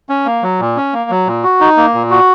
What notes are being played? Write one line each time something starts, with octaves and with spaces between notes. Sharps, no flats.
C#4
A#3
F#3
A#2
C#4
A#3
F#3
A#2
F#4
D#4
A#3
A#2
F#4